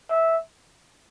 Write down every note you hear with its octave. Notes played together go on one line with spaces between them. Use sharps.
E5